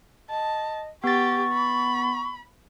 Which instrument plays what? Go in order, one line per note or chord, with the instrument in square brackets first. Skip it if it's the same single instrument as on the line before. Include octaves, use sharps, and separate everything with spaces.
[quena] D#5 [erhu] A5
[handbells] B3 A6 [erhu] G4 [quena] C#6
[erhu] B5